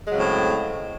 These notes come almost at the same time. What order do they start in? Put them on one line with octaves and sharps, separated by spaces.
G#3 F#3 C#3 C4 A2